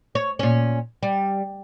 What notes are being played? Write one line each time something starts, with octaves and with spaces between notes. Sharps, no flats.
C#5
A#2 C#4
G3